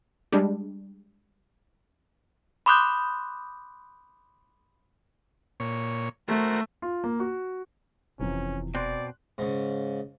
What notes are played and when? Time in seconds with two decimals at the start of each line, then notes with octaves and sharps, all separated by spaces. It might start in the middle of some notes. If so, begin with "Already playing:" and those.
0.32 G3 G#3 D4
2.66 B5 C6 D6 D#6 F#6 G6
5.60 A#2 C#5
6.28 A3 F#4 A#4 C5
6.82 F4
7.04 A#3
7.20 F#4
8.19 F1 C3 E3 F3 C#4
8.75 B2 C4 D5 C6 F#6
9.38 G#2 C#3